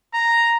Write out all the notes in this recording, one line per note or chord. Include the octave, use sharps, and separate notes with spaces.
A#5